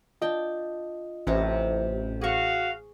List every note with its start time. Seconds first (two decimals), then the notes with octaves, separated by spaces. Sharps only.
0.22 D4 F4 D#5 G5 A5
1.27 A1 C3 A#4 C#5
2.21 F#4 G#4 F5 C#6